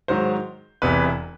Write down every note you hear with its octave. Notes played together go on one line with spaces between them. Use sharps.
G#2 D#3 F#3 C5
E1 E2 C3 E3 B4